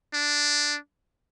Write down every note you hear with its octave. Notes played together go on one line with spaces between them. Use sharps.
D4